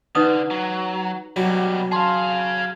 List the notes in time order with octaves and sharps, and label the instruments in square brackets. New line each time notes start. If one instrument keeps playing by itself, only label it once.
[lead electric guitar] D3 [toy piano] D#4 B4 D#6
[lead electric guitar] F#3
[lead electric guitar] B2 G3 [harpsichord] F#3
[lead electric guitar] G#4 F5 [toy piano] A5 C6